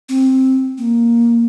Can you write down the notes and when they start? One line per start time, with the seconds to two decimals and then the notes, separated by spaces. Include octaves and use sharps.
0.09 C4
0.78 A#3